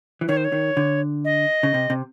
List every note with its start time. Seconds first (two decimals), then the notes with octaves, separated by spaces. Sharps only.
0.21 E3
0.28 D#3 C#5
0.37 C5
0.45 C#5
0.52 D#3
0.77 D3
1.25 D#5
1.63 C#3
1.74 C3
1.90 C3